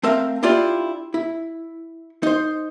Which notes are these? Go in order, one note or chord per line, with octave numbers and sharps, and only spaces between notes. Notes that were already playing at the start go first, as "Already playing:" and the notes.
A3 C4 A#4 E5 F5
D4 E4 F4 G4 D5
E4
D#4 C5